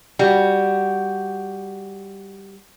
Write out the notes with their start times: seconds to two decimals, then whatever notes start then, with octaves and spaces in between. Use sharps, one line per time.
0.19 G3 F#4